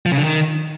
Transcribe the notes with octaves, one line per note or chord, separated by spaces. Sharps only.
F3
C#3
D3
D#3